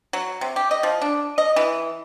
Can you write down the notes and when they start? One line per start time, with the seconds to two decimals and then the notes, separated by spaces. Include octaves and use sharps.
0.13 F#3
0.41 C3
0.56 G4
0.71 D#5
0.83 F3
1.02 D4
1.38 D#5
1.56 E3